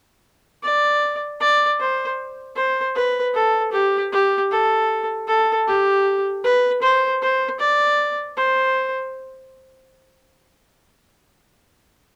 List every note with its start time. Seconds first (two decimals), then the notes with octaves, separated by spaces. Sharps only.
0.63 D5
1.40 D5
1.80 C5
2.56 C5
2.95 B4
3.35 A4
3.73 G4
4.12 G4
4.51 A4
5.27 A4
5.67 G4
6.44 B4
6.82 C5
7.22 C5
7.60 D5
8.37 C5